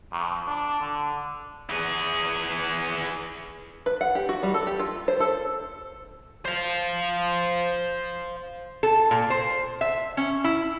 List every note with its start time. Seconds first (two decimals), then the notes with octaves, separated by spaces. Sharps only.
0.12 F2
0.47 D4
0.81 D3
1.70 E3 G#4
3.86 B4
4.01 F#5
4.15 G4
4.29 F#4
4.43 G3
4.54 A4
4.67 G4
4.80 F4
5.08 C5
5.20 A4
6.45 C5 F5
8.83 A4
9.11 A#2
9.30 C5
9.81 E5
10.17 C#4
10.44 E4